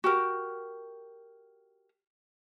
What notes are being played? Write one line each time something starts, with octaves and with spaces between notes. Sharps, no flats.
F#4 G4 A#4